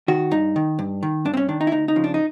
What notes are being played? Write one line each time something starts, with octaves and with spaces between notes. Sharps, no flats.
D#3 F#4
G2 D#4
D#3
G2
D#3
G2 D4
C4
C#4
D#3 D4
D#4
E4
D2 D#4
D#4
C#3 F3
D4
D#4